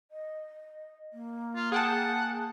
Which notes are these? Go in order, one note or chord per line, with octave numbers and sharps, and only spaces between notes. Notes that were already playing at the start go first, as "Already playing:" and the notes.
D#5
A#3
F4
G#4 F#5 G5 A5